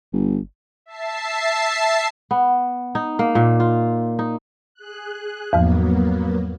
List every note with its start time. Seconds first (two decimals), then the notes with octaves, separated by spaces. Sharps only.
0.13 G1
0.86 E5 A5 C7
2.31 B3
2.95 D#4
3.19 A#3
3.35 A#2
3.60 F4
4.19 D#4
4.74 G#4 F#6
5.53 E2 G#2 F3 F#3 A#3 B3